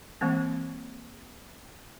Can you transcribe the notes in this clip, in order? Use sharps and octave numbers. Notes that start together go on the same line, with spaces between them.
E3 G#3 A#3 C4